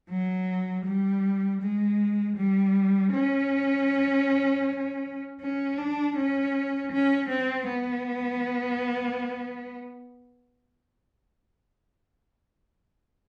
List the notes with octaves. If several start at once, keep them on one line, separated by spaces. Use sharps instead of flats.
F#3
G3
G#3
G3
C#4
C#4
D4
C#4
C#4
C4
B3